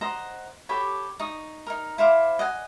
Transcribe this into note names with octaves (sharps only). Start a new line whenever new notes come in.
C5 D#5 F#5 A#5
G4 A4 C#5 B5
D#4 C#6 D#6
D#4 A#4
E4 C5 F5 D6
D#5 F#5 G#5